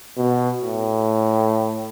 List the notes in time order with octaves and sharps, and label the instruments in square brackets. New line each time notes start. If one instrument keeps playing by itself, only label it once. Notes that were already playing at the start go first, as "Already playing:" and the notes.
[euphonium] B2
A2